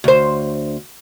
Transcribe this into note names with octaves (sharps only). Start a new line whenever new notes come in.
D2 C5